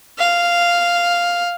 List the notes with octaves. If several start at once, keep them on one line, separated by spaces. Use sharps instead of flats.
F5